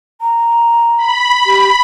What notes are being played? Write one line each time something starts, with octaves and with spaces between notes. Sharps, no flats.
A#5
B5
G4